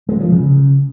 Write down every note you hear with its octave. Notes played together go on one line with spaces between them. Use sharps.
G#3
F3
C#3